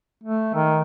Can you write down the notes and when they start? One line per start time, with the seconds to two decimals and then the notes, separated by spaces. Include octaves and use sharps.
0.24 A3
0.55 D#3